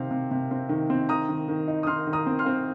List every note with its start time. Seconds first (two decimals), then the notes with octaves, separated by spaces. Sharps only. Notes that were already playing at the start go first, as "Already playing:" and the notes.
Already playing: C3 D#3 C4 F5
0.11 C3
0.31 C3
0.51 C4
0.69 D#3
0.90 C4
1.09 D#3 A#5 D#6
1.29 D#3
1.48 D#3
1.68 D#4
1.83 D#6
1.87 D#3 C6 F6
2.07 D#3
2.13 A#5 D#6
2.26 C4
2.39 C6 F6
2.46 C4